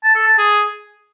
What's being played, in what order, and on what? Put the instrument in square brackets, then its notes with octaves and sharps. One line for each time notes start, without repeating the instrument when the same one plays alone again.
[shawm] A5
A4
A5
G#4